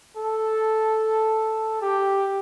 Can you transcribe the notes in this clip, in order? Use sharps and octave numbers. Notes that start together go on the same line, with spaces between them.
A4
G4